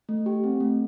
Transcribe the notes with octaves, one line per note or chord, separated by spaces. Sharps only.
A3
G4
C4
A3